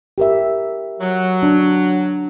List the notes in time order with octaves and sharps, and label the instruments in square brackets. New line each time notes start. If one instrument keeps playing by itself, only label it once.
[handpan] G4 A#4 E5
[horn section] F#3
[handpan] D4